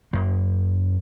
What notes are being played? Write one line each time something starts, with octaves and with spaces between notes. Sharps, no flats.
F#2 A#3